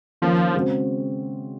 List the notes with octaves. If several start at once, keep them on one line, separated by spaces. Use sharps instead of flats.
D#3 F3 A#3 C#4
C#3 G#3 C4 F#4 C5